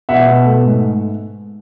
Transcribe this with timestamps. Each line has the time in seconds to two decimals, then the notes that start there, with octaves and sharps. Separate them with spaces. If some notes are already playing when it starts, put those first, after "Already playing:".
0.09 B2 E5 F#5
0.27 B2
0.45 A3
0.63 G#2